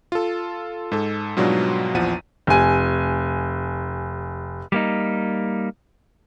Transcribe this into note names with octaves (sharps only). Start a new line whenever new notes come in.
F4 A4
G#2 A4
G#2 B2 F#3 G3 D4 F4
A#1 E2 F3 F#5 D#7
F1 G#5
G3 A#3 D#4